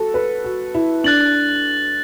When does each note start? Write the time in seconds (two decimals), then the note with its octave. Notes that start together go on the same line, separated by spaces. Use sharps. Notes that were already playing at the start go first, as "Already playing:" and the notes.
Already playing: F#4 A4
0.14 B4
0.45 F#4
0.75 E4
1.04 D4 F#6 A6 F#7